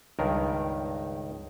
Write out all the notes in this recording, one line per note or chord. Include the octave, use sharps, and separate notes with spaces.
C#2 G2 D#3 A#4